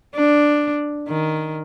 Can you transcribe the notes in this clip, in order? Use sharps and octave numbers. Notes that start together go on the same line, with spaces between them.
D4
D#3